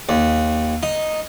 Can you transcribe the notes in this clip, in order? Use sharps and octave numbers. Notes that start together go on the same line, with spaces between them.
D#2
D#4